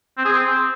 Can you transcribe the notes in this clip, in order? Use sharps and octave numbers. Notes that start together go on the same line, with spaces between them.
C4
G#4
C4